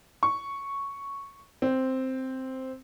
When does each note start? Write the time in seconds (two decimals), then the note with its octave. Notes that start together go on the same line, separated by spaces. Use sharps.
0.23 C#6
1.62 C4